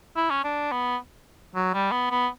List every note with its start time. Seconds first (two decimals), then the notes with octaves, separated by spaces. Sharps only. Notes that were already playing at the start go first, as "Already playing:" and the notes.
0.16 E4
0.30 C#4
0.44 D4
0.71 B3
1.55 F#3
1.73 G3
1.91 B3
2.10 B3